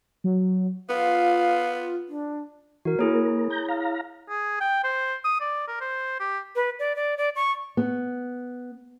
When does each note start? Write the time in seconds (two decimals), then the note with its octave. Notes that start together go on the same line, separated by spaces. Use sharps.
0.24 F#3
0.89 B3 F4 F5
2.08 D4
2.85 E3 F#4 A#4
2.99 A#3 E4 G#4 A#4 C#5
3.50 A#5 G6
3.68 F5 A#5
4.29 G#4
4.61 G5
4.84 C5
5.24 D#6
5.41 D5
5.68 A#4
5.80 C5
6.20 G4
6.56 B4
6.79 D5
6.96 D5
7.18 D5
7.36 C#6
7.77 B3